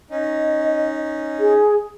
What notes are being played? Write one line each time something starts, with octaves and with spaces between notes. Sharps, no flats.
C#4 D#4 D#5
G#4